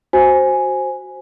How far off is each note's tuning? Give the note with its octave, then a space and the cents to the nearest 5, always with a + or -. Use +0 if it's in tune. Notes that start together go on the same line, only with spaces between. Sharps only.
F#4 +5 C5 +10 G#5 +0